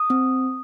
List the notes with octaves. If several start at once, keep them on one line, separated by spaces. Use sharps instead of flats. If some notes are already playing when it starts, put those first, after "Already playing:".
Already playing: D#6
C4